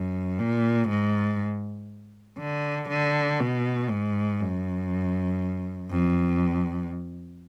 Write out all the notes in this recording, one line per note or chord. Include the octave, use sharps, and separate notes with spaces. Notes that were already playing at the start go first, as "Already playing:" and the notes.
Already playing: F#2
A#2
G#2
D3
D3
B2
G#2
F#2
F2